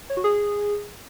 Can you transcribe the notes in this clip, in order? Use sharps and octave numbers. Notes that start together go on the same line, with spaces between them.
C#5
F#4
G#4